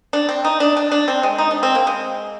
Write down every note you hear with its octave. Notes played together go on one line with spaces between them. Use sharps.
D4
C4
D#4
D4
D4
D4
C4
G#3
D#4
D4
C4
A#3
G#3